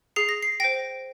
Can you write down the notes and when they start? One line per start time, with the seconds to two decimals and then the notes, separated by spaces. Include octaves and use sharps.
0.16 G#4 C7
0.29 A#6
0.42 C7
0.60 C5 G5 A#6